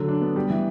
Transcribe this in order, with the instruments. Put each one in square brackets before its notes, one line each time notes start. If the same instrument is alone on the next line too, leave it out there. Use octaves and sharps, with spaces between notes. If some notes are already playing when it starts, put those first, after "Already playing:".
Already playing: [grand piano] D3 F#3
D4
B3
G3
E3